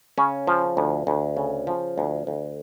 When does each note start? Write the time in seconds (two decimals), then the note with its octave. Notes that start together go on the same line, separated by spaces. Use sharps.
0.18 C#3 C#4
0.47 F3
0.77 D2
1.07 D2
1.37 C#3
1.67 F3
1.98 D2
2.27 D2